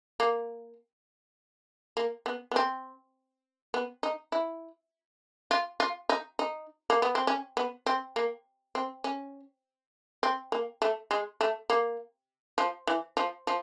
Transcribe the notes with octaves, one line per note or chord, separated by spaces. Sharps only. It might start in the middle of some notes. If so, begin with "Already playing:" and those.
A#3
A#3
B3
B3
C4
B3
D#4
E4
F4
F4
D#4
D#4
A#3
B3
C4
C#4
B3
C4
A#3
C4
C#4
C4
A#3
A3
G#3
A3
A#3
F3
E3
F3
F3